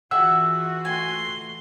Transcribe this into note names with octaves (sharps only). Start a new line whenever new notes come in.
E3 F4 F#4 G#4 E5 F#5 E6
A3 G#5 C6